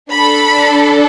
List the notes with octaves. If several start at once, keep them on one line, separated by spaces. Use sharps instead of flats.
D4 A4 B5